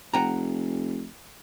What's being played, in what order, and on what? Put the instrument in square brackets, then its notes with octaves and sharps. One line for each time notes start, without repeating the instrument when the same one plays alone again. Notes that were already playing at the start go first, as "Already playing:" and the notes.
[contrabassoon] F1 [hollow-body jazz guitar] F#5 G5 A#5